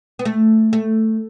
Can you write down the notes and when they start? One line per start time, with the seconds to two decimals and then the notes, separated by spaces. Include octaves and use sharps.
0.19 B3
0.25 A3
0.73 A3